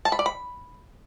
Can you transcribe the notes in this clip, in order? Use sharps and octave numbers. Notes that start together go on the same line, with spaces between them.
A5
B5
D5
B5